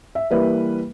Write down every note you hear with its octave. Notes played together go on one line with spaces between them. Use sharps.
E5
E3 G3 A#3 B4 E5